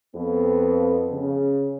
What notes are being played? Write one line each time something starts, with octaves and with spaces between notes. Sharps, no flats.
F2 B3
C#3